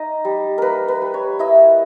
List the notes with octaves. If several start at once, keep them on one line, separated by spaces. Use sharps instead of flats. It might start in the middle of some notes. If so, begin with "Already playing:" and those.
Already playing: D#4 D#5
G3
A#3 A#4 B4
B4
G3
C#5
E4 D#5